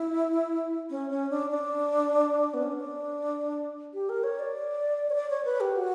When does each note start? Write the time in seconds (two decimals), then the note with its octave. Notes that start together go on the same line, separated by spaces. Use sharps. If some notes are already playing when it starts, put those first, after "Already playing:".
Already playing: E4
0.90 C#4
1.10 C#4
1.30 D4
1.50 D4
2.54 B3
2.63 C#4
2.72 D4
3.94 G4
4.09 A#4
4.24 C#5
4.39 D5
5.10 C#5
5.15 D5
5.30 C#5
5.45 B4
5.61 G4
5.76 F#4